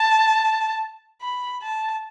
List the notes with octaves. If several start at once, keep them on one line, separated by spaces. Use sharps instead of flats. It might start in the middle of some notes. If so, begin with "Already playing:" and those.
Already playing: A5
B5
A5